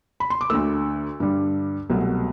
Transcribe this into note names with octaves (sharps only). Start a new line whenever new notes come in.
B5
C6
D6
D2 D3 A3 E6
G2 D3 G3
C2 B2 F#3 A3